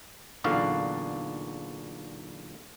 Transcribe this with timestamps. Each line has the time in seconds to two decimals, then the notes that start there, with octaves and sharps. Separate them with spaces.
0.44 B1 E2 A#2 D3 F#4 F5